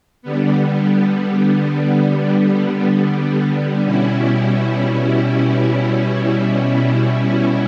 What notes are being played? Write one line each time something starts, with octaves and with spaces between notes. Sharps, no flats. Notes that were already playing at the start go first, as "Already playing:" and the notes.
D3 G3 B3
B2 G3 C#4 E4